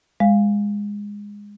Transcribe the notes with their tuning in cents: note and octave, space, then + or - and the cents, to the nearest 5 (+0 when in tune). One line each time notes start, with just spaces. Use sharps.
G#3 -15 F5 +0